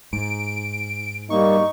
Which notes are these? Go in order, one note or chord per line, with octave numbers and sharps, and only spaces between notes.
G#2 D7
G3 A#3 D#4 C#6